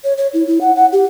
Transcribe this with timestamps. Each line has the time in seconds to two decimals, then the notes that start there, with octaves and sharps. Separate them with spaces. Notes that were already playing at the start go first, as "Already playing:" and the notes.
0.04 C#5
0.18 C#5
0.34 E4
0.47 E4
0.61 F#5
0.76 F#5
0.93 G4